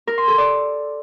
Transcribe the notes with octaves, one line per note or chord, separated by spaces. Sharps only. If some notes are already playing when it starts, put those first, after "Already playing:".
A#4
C6
A4
D5